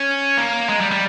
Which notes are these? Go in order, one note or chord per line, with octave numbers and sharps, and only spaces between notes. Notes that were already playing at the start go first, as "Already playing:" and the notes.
Already playing: C#4
A#3
G#3
G3
G3